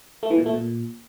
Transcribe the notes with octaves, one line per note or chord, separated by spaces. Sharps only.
A3
E3
A#2
A3
A#2